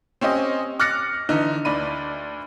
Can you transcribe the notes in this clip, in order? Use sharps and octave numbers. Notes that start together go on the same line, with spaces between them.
C4 C#4 G4 D#5
D6 F6 F#6 A6 A#6 C#7
D3 E3 D#4
D2 D5 B5 D#7